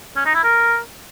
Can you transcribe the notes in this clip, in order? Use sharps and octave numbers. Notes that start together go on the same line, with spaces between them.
C#4
D#4
E4
A#4